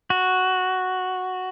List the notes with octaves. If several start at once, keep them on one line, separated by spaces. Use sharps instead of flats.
F#4